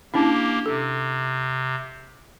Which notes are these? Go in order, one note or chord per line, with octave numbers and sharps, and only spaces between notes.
A#3 C#4 D4 E4 G4
C3 A4